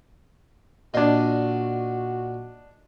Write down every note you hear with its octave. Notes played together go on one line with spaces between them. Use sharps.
A#2 D4 F#4 D#5 C6